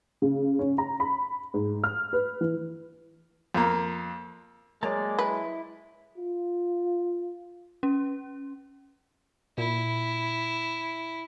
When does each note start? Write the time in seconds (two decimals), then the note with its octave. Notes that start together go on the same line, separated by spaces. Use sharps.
0.22 C#3
0.59 C#4
0.78 A#5
1.00 B5
1.54 G#2
1.84 F6
2.13 B4
2.41 E3
3.54 F2 A#3
4.83 F#3 G#3 A#3 A#4 D5 A5
5.19 E4 B4
6.18 F4
7.83 C#4
9.58 A#2 E4